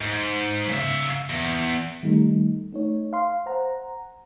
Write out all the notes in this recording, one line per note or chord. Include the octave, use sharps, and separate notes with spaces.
G#2
C#3 E5
E2
D#3 G3 A3 D#4
A3 D#4 C#5
F5 C6
C5 F#5 A#5